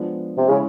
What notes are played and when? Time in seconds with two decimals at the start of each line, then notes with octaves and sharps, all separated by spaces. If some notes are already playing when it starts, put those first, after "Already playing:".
Already playing: F3 G#3 B3 D4
0.38 C3
0.48 C#3 G#3 C#4 E4